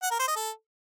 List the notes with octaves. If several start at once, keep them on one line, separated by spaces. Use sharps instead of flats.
F#5
A#4
C5
D#5
A4